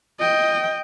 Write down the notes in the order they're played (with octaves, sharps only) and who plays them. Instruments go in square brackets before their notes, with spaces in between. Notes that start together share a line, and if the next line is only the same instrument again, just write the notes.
[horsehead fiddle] D#5 G5